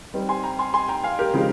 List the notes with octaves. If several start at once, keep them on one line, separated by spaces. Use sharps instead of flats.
G3 C4 D#4
G#5 C6
G5 A#5
G#5 C6
G#5 C6
G5 A#5
F5 G#5
G4 A#4
C#3 F3 G#3 D#4